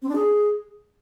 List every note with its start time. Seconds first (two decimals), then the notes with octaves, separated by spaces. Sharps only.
0.02 C4
0.09 D4
0.15 G#4